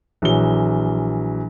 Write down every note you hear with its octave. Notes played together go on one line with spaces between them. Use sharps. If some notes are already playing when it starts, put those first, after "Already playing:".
A#1 E3 F#3 G7